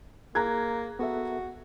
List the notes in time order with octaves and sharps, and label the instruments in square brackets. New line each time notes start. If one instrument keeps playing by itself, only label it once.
[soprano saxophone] A#3 [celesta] G#4 [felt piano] A#5 F#6 G#6
[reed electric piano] B3 A4 E5 [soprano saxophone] F#4